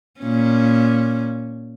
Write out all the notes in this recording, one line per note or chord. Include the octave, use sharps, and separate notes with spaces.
A#2 C#4